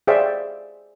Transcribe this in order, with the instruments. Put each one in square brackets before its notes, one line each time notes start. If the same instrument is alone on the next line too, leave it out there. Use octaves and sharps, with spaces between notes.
[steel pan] G#4 C5 D5 E5 F5 G5